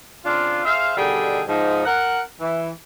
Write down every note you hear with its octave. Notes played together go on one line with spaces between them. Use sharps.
C#3 C4 D4 F4
G#4 C5 E5 F5
B2 D3 D#3 G3 G#4 G5
G#2 F3 D#4
A#4 F#5
E3